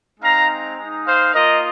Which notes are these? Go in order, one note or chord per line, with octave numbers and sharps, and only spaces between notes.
G#3 C4 D#4 F5 A#5
G#3 D#4
C5 F5
A#3 F4 A#4 D#5